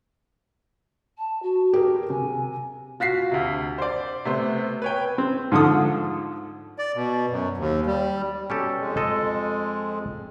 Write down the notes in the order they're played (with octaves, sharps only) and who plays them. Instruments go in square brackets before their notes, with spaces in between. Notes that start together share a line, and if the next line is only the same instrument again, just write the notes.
[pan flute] A5
F#4
[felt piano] G4 G#4 A#4
[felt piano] C3 [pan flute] G#5
[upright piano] F4 F#4 B6 C7
D2 C3
C5 D5
C3 A3 B3 C5
B4 C#5 G5
[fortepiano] C4
G#2 D3 F3 A4 D#6
[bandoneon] D5
B2
F#2
D#2
G3
[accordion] B2 [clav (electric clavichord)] C#4 G4 A4
[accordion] F2 G#3
[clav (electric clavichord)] A4 D#5